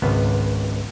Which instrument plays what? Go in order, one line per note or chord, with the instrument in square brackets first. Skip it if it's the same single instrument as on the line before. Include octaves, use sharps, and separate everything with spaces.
[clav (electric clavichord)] G#1 C#2 B3